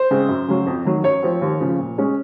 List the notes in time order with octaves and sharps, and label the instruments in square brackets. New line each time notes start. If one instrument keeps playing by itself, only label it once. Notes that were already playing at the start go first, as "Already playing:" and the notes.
Already playing: [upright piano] C5
C#3 G#3 C4
F#2
C#3 F#3
F2
D#3 F#3
F#2 C#5
F3 C4
D#2
C#3 F3
A#2
G#3 C#4